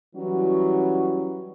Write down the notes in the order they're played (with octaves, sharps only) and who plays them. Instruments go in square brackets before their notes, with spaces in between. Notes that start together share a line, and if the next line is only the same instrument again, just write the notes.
[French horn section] E3 F#3 G3 C#4 F#4